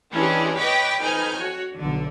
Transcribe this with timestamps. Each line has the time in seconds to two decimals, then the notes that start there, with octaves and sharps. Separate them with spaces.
0.13 E3 G#3 C#4 D4 G4 G#4
0.57 B4 C#5 D#5 G5 D6 B6
0.99 F2 D#4 B4 G#5 F6 G6
1.34 F#4 C#5
1.75 B1 D3